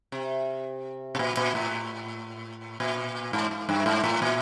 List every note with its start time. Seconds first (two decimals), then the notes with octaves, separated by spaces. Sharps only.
0.12 C3
1.15 B2
1.19 A#2
1.37 A#2
1.55 A2
2.80 A#2
3.33 G#2
3.51 G#2
3.69 G2
3.86 G#2
4.04 A2
4.22 A#2